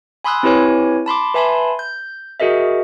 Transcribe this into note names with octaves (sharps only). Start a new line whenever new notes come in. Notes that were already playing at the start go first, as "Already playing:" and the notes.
G#5 B5 C6 D#6 E6 F#6
C4 E4 G4 B4 C#5 G#5
A5 B5 C6 D6
B4 E5 G#5 A5 B5 C6
G6
F#4 G#4 A#4 D#5 E5